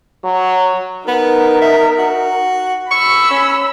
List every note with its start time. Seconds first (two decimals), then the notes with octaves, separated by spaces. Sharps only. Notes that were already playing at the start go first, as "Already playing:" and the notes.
0.24 F#3
1.08 B3 D#4 A#4
1.62 E5
1.99 F#4
2.91 B5 C#6 E6
3.31 C#4